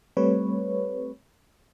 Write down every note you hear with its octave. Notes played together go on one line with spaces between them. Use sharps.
G3 A3 C4 B4 C#5